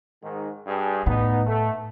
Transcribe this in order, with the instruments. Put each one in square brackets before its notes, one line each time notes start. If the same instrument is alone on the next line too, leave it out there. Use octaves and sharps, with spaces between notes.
[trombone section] G#2 D#3
G2 G#4
[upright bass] A2 [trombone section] B3 D#4
[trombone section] A3